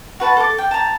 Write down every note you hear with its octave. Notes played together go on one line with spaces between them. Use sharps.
F#4 B4 A5
A4 D6
G5
A5 A#5